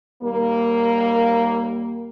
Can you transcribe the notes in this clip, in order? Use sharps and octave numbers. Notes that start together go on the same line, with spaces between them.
D#2 G3 A#3